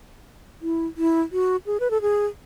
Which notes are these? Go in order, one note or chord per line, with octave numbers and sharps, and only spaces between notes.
E4
E4
F#4
G#4
B4
A4
G#4